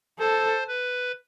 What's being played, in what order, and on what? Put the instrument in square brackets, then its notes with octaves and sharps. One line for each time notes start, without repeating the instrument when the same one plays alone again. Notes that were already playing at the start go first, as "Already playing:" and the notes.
[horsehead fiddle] A4 [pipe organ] C5
[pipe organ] B4